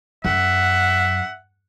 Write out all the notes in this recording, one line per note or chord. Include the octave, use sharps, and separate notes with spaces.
F#2 E5 F#5